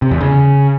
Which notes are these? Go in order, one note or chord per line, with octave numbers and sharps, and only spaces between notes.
C3
E2
C#3